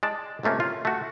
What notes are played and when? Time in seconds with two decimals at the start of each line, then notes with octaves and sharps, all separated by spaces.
0.03 G#3 D5 A5
0.43 C#2 C3 A3 A#3 C#4
0.60 F4
0.85 A3 F#4